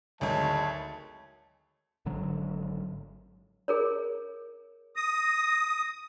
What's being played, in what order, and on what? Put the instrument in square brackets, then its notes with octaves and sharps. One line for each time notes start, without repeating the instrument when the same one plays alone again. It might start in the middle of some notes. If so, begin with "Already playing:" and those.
[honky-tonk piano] G#1 D2 [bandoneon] F#3 G#3 C#5 [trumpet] A5
[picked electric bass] G#1 G#2 D3 F#3
[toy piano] G#4 A#4 C#5
[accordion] D#6 [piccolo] A#6